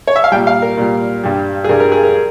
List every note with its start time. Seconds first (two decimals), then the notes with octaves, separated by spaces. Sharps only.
0.07 C#5
0.16 E5
0.24 F5
0.32 A#2 G3 G5
0.47 F5
0.62 A#4
0.77 A#2 G3
1.23 G2 G3
1.64 G#4
1.69 G2 G3 A#4
1.80 A#4
1.92 G#4
2.03 A#4